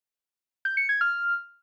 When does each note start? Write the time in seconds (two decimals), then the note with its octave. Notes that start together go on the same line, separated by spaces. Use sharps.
0.65 G6
0.77 C#7
0.89 G#6
1.01 F6